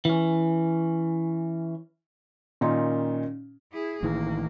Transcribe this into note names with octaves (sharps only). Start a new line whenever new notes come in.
E3 C#4
A#2 D#3 C#4 D#4 F4
E4 G#4
A1 D#3 E3 A#3